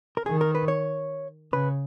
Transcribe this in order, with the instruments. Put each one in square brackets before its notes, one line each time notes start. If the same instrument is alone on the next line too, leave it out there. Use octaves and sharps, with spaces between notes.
[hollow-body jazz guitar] A#4
[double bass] D#3 [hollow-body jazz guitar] G#4
[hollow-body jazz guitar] A#4
B4
C#5
[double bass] C#3 [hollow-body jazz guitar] B4